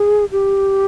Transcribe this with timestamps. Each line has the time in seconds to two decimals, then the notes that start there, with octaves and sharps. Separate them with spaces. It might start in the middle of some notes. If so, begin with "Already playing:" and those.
Already playing: G#4
0.32 G4